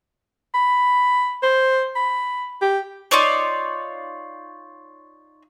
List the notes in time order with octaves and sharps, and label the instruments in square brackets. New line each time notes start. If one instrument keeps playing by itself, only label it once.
[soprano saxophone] B5
C5
B5
G4
[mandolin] D#4 F4 C#5 D5